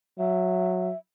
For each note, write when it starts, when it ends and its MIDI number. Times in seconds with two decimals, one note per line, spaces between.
0.19 0.91 54
0.19 0.97 76